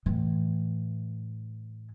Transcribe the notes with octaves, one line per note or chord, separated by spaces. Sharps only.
A2 E3